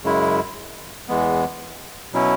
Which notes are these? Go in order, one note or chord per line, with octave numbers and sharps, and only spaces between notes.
F#2 C#3 G#3 E4
E2 E3 G#3 B3
B2 F#3 C#4 E4